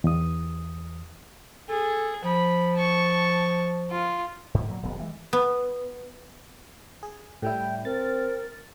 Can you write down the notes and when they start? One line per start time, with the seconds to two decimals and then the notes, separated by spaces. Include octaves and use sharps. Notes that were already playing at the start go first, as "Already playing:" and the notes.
0.04 E2 D#6
1.69 G#4 A4
2.24 F3 B5
2.76 A5 C#6
3.91 F4
4.54 G#2
4.68 A#2 F#3 A#3
4.82 D#1 B1 F2 B3
4.99 E3 G#3
5.33 B3
7.03 G#4
7.42 A2 G3 E4 G5
7.85 C4 A#4 A6